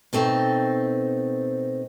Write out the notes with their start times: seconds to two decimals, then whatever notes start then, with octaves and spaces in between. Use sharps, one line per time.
0.13 B2 A3 C4 D#4